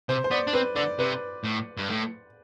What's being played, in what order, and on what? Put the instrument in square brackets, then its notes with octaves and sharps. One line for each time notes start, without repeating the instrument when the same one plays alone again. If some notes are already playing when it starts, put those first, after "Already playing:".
[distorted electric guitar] C3 [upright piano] C5
[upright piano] C5
[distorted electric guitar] B3 [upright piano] D5
[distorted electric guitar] D4
[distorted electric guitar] C4 [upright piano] B4
[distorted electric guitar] D3 [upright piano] D5
[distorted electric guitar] C3 [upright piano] B4
[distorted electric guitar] A2
G2
A2